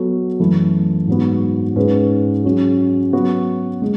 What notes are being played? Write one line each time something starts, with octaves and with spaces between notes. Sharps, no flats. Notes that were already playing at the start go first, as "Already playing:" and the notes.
Already playing: F#3 B3 F#4 A4
F#2 E3 A3
G#2 F#3 B3 F#4
G#2 G#3 C#4 G#4 B4
F#3 C#4 G#4
F#3 B3 F#4
G#3